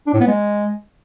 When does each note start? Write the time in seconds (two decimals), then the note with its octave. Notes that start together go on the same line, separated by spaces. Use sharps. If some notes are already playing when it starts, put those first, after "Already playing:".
0.07 D4
0.14 A2
0.21 B3
0.27 G#3